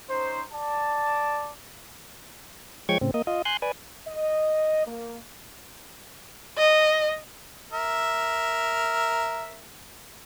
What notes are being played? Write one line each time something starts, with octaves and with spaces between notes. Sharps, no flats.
C#4 D#4 C5
D5 A5
F3 G#3 C#5 G5 C#6 G#6
A2 C#3 C4
A#3 D#5
F4 D#5
G#5 C6 F#6 G6
B4 D5 G#5
D#5
A#3
D#5
A#4 E5